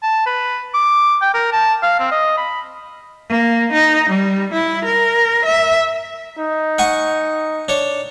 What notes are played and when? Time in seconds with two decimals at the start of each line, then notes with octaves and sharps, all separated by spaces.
0.03 A5
0.26 B4
0.74 D6
1.21 G5
1.34 A#4
1.52 A5
1.83 F5
1.99 C4
2.11 D#5
2.37 B5
3.29 A#3
3.73 D#4
4.10 G3
4.53 E4
4.85 A#4
5.45 E5
6.38 D#4
6.78 F#5 G#5 C#6
7.68 D4 C#5